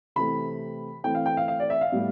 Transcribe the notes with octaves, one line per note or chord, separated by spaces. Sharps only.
C3 E3 A3 C4 B5
E3 A3 C4 G5
F5
G5
F5
F5
D5
E5
F5
A2 G3 B3